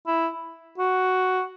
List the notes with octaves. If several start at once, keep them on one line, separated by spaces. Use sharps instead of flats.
E4
F#4